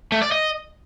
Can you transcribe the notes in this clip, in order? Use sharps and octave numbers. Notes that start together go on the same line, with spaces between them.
A3
D5
D#5